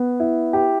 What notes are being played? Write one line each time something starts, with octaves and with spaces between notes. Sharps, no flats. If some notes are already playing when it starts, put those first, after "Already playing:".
Already playing: B3
E4
G4